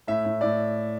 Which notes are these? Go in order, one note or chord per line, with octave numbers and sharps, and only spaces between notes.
A2 E5
A2
A2 D5